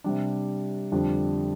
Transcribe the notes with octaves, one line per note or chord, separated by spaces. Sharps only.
C3 G3 D4
F2 D3 G3 D4